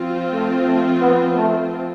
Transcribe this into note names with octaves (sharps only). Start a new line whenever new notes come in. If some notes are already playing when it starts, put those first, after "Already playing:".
Already playing: F3 C4 F4
A3
A3
B3
A3